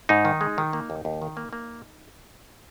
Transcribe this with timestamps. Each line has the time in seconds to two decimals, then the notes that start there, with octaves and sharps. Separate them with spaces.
0.09 G#2 D#4
0.25 D#3
0.41 G#3
0.58 D#3
0.73 A#3
0.90 D#2
1.05 D#2
1.22 D#3
1.37 A#3
1.53 A#3